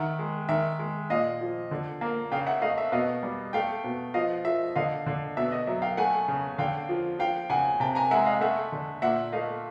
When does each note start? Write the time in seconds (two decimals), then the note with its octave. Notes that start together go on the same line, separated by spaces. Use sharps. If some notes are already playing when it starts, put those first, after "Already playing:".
Already playing: D#3 E5 F#5
0.19 G#3
0.49 D#3 E5
0.79 G#3
1.10 A#2 D#5 F5
1.41 F3
1.71 D3
2.01 A#3
2.32 C#3 F5 G5
2.47 E5 F#5
2.62 A3 D#5 F5
2.78 E5
2.92 B2 D#5 F5
3.23 G3
3.53 A3 F5 G5
3.84 B2
4.14 F3 D#5 F5
4.45 F3 E5
4.75 D3 D#5 F5
5.07 D3
5.37 B2 E5
5.52 D#5
5.67 F#3 E5
5.82 F5 G5
5.97 A3 F#5 G#5
6.28 C#3
6.58 D3 F5 G5
6.89 F3
7.19 F3 F5 G5
7.50 C#3 F#5 G#5
7.80 C3 G5 A5
7.95 G#5 A#5
8.11 G#3 E5 F#5
8.26 D#5 F5
8.41 A3 E5 F#5
8.72 D3
9.02 A#2 E5 F#5
9.32 A3 D#5 F5